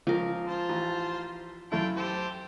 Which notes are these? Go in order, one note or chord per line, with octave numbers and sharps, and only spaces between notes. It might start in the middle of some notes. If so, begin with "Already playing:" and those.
C#2 F3 A#4
F4 C5 A5
A1
F#2 A3 E4 F4 G5 A5
G4 A4 C5